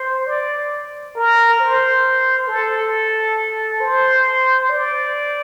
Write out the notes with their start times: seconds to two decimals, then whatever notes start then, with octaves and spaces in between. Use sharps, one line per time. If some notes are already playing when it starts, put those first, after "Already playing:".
Already playing: C5
0.27 D5
1.16 A#4
1.59 C5
2.48 A4
3.81 C5
4.69 D5